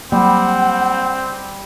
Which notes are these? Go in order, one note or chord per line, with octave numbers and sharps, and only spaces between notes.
F#3 G3 A#3 C4 F#5